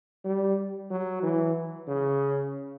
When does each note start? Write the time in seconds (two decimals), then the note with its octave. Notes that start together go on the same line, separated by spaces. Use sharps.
0.25 G3
0.90 F#3
1.23 E3
1.88 C#3